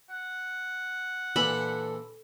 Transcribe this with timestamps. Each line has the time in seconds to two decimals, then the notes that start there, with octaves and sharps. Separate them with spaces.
0.10 F#5
1.36 A#2 E3 D4 A4 B5